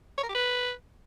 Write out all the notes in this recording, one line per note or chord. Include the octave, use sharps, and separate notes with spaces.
C#5
A#4
G4
B4